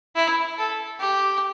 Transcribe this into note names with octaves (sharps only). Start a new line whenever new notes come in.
E4
A4
G4